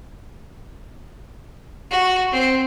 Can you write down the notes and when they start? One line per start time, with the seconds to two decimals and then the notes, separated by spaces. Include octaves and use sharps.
1.91 F#4
2.32 C4